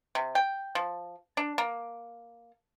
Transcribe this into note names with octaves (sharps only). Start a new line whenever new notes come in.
C3
G5
F3
D4
A#3